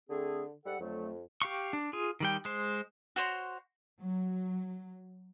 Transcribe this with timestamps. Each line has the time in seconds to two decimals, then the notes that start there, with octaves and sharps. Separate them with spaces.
0.10 D3 A3 C4 G#4
0.66 G#2 G3 A4 F#5
0.80 F2 D3 F#3 A3
1.42 G4 F5 C#6
1.73 D4
1.93 F4 G#4
2.20 D#3 G3 G5
2.45 G#3 C5
3.16 F#4 C5 C#5 C6
4.02 F#3